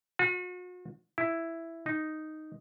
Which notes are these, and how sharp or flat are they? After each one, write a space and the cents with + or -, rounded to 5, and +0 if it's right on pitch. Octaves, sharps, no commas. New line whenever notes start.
F#4 -40
E4 +5
D#4 -5